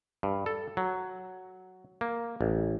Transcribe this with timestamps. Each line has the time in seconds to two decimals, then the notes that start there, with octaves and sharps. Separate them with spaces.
0.23 G2
0.46 A4
0.77 F#3
2.01 A#3
2.41 A1